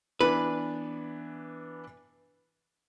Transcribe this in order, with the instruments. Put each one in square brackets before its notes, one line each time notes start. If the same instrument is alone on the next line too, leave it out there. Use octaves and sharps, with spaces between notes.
[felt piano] E3 B3 D4 [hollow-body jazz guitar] B4